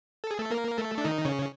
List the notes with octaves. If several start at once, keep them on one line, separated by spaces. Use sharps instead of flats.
A4
G#4
A3 A4
A#3 A#4
A3 A4
D4
D#3 D#4
C#3 C#4